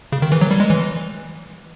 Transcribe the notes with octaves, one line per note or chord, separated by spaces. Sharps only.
C#3
D#3
E3
F#3
G3
G#3
E3